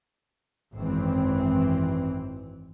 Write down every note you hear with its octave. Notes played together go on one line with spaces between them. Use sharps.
G#1 F#2 E3 C4